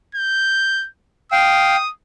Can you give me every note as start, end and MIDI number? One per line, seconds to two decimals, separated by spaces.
0.15 0.88 91
1.32 1.76 77
1.32 1.76 79
1.32 1.91 87